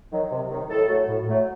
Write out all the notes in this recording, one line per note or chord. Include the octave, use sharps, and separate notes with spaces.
D#3 F#3
C3
D#3 F#3
A2 A4
F#3 A3
A2
F#3 A3